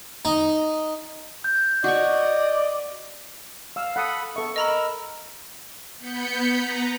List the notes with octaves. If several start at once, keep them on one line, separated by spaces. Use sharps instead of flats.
D#4
G6
F#4 D5 D#5 C#6
F5 E6
A4 F#5 B5 D#6
B3 A4 E5 C#6
A#4 D#5 A#5 B5 E6
B3 B5 G6 C#7
B4 A#5